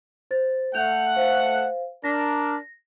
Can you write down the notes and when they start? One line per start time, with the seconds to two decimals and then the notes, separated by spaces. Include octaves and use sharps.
0.31 C5 A6
0.75 A3 F#5 G6 F7
1.16 C5 F5
2.04 D4 A#4 A#6